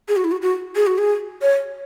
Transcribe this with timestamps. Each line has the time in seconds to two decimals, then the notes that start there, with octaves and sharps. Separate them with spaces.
0.08 G#4
0.16 F#4
0.24 E4
0.32 F#4
0.42 F#4
0.76 G#4
0.87 F#4
0.98 G#4
1.42 C#5